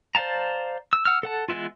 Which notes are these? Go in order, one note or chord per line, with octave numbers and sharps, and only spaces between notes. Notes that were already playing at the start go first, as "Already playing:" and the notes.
C5 D5 F5 A5 A#5
E6
F#5 E6 F6
A4 F#5 A5
E3 G#3 B3 E4 F4